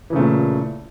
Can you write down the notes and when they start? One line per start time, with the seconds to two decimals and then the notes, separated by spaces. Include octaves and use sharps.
0.10 E3
0.13 C#3
0.16 A3
0.19 A#2